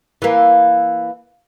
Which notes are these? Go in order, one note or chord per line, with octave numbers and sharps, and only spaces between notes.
E3 A#3